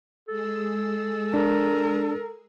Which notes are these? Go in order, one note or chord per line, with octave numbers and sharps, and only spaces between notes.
G#3 G#4 A4 E6
D4 A#4